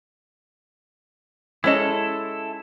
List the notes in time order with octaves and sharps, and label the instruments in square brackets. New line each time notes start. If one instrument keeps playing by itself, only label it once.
[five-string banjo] G#3 C#4 D#5 [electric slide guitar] E4 A4